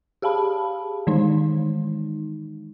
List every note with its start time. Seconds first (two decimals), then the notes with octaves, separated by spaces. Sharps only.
0.22 G4 G#4 F5 A5 B5
1.07 D#3 E3 G#3 D#4